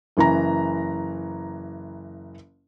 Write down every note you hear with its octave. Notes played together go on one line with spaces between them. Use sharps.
F#1 E3 A#5